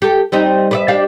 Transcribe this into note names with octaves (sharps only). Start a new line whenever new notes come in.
G4 A4
G3 C4 D#4
B4 D5 E5
D4 G4 F5